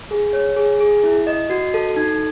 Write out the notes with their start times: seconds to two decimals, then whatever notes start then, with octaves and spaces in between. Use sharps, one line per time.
0.11 G#4
0.33 C#5
0.56 G#4
0.80 G#4
1.04 E4
1.27 D#5
1.50 F#4
1.74 A4
1.96 D#4